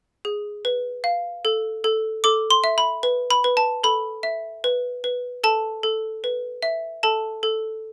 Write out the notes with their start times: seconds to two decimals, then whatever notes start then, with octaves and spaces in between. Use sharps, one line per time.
0.25 G#4
0.65 B4
1.04 F5
1.45 A4
1.84 A4
2.24 A4 D6
2.51 C6
2.64 E5
2.78 B5
3.03 B4
3.31 B5
3.44 B4
3.57 A5
3.83 A4 B5
4.23 E5
4.64 B4
5.04 B4
5.44 A4 A5
5.83 A4
6.24 B4
6.62 E5
7.03 A4 A5
7.43 A4